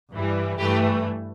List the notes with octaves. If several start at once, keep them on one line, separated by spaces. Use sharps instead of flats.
G2 E3 G3
G2 E3 A3 G4 B4